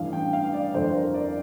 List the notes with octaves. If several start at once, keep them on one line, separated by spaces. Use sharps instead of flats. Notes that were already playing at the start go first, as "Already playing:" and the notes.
Already playing: A1 G2 E3 F5
G5
F5
D5
G1 F2 D3 C5
A#4
D5